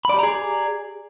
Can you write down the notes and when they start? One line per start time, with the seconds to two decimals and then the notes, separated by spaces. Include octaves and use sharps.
0.05 B5
0.09 D5
0.14 G4
0.19 A#5
0.23 G#4